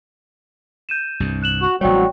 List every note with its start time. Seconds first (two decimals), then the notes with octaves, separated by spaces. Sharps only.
0.89 G6 D#7 E7
1.20 C2 G2
1.42 F#6 E7 F#7
1.62 F#4
1.81 A1 F#3 G3 C4 F#4 C#5 D5 G5